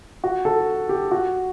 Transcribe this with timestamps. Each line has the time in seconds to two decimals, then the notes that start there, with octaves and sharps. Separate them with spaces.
0.24 F#4
0.45 A4
0.89 G4
1.11 F#4